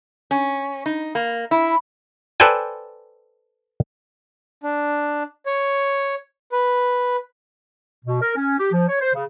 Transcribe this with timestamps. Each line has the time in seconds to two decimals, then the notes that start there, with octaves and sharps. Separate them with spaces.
0.31 C#4
0.86 D#4
1.15 A#3
1.51 E4
2.40 A4 B4 C5 D5 G5 G#5
4.63 D4
5.46 C#5
6.52 B4
8.05 B2
8.22 A#4
8.36 C#4
8.59 G4
8.72 F3
8.89 C#5
9.01 C5
9.14 C#3